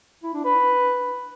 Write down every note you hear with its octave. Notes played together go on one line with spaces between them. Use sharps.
E4
D4
B4